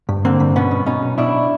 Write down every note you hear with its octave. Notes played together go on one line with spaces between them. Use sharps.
G2
D3 A#3 C4
G2
B2 B3 C#4
B2
B2 C#4 D#4
B1
B2 D4 E4